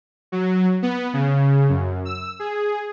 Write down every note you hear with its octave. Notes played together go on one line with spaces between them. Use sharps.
F#3
B3
C#3
F#2
E6
G#4